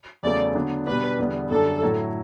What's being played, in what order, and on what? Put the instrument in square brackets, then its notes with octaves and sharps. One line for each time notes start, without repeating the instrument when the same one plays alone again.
[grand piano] E2 C#3 F#3 A3 [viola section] D5
[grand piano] D3 F#3 B3 D4
[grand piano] B2 G3 D4 [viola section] B4
[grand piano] E2 D3 G3 B3
[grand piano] F#2 D3 G3 D4 [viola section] A4
[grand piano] A2 F#3 A3 E4